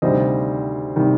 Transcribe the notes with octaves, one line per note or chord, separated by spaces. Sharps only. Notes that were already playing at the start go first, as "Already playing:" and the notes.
D2 C3 D#3 G3 C5 D#5
C3 D#3 G3